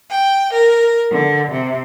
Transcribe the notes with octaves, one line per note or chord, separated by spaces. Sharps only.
G5
A#4
D3
C3